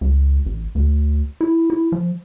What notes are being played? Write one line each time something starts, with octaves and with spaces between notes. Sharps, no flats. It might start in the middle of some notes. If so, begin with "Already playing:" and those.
C#2
A1
D2
E4
E4
F3